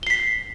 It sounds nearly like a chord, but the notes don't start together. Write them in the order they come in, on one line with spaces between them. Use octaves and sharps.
G7 C7 B6